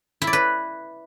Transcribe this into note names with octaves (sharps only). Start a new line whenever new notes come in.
E4
D5
B4